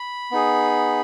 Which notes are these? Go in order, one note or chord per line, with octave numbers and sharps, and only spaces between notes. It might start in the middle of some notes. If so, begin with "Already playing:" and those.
Already playing: B5
B3 D#4 G#4